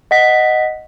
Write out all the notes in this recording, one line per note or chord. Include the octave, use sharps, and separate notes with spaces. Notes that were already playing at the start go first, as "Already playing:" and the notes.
D#5 F#5 B6